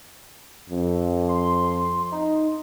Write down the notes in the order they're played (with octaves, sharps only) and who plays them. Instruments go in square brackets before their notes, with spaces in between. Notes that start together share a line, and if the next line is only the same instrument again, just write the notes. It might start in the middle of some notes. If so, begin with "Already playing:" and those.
[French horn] F2
[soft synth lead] C6
D#4